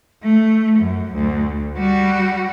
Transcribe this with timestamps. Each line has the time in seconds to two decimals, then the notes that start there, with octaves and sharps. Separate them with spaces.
0.23 A3
0.78 F#2
1.15 D2
1.77 G3 F#4